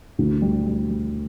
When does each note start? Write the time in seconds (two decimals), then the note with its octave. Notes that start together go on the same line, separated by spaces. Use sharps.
0.19 D2
0.42 G3
0.66 G3
0.89 G3